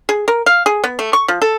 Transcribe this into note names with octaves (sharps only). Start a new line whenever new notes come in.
G#4
A#4
F5
G#4
B3
A3
C#6
F3
A4